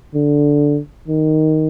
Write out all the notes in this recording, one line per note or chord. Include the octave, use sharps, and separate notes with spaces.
D3
D#3